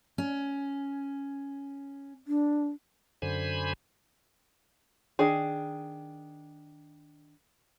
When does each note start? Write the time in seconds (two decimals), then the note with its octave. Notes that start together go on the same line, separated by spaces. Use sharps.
0.18 C#4
2.27 D4
3.22 F#2 D3 C5 G#5 B5
5.19 D#3 D4 G#4